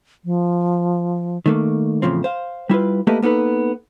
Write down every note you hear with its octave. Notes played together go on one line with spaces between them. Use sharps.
F3
D#3 A3 A#3
E2 A2 C#3 F3 C4
C5 F5
G3 E4 F4 B4
A3 A#3 E4 G4 B4 D#5
A#3 B3 D#4 A4 B4